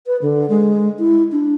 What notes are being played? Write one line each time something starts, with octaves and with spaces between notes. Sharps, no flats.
B4
D3
G#3
E4
D4